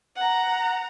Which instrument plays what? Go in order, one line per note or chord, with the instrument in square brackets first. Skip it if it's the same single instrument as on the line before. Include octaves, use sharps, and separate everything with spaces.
[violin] F#5 A#5